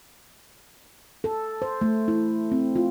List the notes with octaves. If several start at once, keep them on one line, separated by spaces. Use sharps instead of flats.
A4
C5
A3
E4
C4
F4